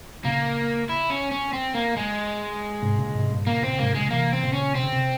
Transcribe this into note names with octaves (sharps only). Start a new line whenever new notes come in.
A#2 C#3 A#3
E4
C#4
C#4
C4
A#3
G#3
G#2 C3
A#2 C#3
G#2 C3
G2 A#2
A#2 C#3 A#3
A#2 C#3 C4
G#2 C3 A#3
A#2 C#3 G#3
C3 E3 A#3
C4
A#2 C#3
C#4
C3 C4
C#3
C3